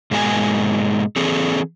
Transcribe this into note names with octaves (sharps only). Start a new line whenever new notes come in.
G#2 B2 G#3 A#3 G4 G#5
E3 C4 G#4 A4